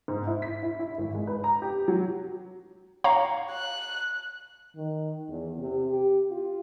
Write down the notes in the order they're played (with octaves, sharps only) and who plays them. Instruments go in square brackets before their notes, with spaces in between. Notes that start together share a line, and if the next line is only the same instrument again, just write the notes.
[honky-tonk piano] G#2
E4
B6
E4
E4
G#1
G#3
B4
A#5
G4
F#3
[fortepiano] C#5 [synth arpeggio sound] F5 A#5
[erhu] F#6
[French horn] D#3
E2
C3
G4
F4